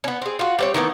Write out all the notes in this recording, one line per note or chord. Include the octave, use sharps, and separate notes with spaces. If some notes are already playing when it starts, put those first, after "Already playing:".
B3 C#4
C4 G#4
F4 F#4
G3 C4 C#5
D#3 E3 A3 B3